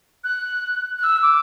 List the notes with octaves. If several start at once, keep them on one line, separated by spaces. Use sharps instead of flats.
F#6
F#6
E6
D6